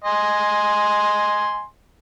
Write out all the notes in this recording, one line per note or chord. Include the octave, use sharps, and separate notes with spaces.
D#5 G#5 C6